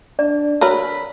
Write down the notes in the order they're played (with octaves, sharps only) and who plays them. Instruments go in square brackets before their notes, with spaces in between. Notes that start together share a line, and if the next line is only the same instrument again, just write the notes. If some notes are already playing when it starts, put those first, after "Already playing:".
[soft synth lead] D4 [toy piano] D5
[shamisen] F#3 A#4 B4 [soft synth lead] B5 [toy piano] E6